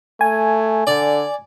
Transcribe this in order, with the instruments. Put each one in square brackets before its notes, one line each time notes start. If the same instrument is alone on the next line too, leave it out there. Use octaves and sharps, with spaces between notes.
[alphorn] A3 [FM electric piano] G#5
[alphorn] D3 [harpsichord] D5